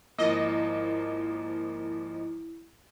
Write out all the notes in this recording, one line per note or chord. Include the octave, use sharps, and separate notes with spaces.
G#1 F3 A#3 E4 D#5